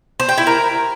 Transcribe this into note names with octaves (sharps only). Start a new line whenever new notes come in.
C5
G5
E4
A#4